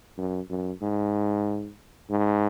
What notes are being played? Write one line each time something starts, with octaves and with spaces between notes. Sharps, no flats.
F#2
F#2
G#2
G#2